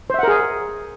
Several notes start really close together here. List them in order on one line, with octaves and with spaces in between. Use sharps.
C5 E5 F#5 A#4 G#4